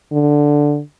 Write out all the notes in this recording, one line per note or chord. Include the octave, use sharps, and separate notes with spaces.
D3